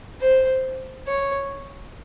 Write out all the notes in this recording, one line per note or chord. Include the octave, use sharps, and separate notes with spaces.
C5
C#5